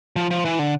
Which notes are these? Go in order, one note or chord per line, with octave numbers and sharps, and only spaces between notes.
F3
F3
E3
D3